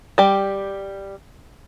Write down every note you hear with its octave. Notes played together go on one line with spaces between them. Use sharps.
G3 G4